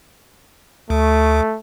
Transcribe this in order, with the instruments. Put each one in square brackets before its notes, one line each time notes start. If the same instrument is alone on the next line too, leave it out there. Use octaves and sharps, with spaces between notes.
[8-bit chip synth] D2 [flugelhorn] A3